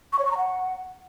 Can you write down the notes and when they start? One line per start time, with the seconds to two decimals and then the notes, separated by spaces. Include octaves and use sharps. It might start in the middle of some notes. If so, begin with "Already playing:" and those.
0.13 C#6
0.19 C#5
0.25 C#6
0.31 A#5
0.37 F#5